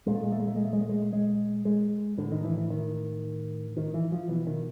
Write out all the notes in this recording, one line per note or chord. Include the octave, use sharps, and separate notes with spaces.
A#2 G#3
A3
G#3
A3
G#3
A3
G#3
A3
G#3
A3
G#3
G#3
G#3
A2 D3
D#3
E3
E3
D#3
D#3
E3
F3
B2 E3
D#3